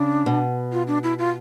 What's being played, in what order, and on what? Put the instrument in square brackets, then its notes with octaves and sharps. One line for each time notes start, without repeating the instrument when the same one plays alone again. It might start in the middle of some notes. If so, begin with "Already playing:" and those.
Already playing: [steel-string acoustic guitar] C#3 [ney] D4
[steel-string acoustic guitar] B2
[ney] F4
D4
E4
F4